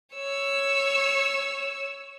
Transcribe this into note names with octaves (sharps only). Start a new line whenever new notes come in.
C#5 E6